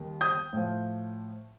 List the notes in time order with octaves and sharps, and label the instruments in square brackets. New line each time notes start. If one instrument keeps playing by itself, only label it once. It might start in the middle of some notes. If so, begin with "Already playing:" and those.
Already playing: [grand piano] D#2 D#3 G3
D#6 G6
A2 F3